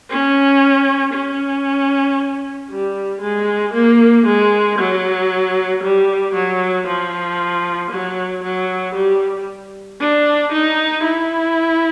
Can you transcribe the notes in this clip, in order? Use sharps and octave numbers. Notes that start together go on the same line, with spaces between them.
C#4
C#4
G3
G#3
A#3
G#3
F#3
G3
F#3
F3
F#3
F#3
G3
D4
D#4
E4